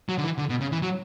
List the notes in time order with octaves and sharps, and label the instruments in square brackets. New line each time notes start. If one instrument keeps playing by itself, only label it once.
[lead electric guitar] F#3
D3
E3
D3
B2
C#3
E3
F#3